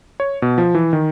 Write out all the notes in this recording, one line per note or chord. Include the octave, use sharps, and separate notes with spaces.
C#5
B2
F3
E3
D#3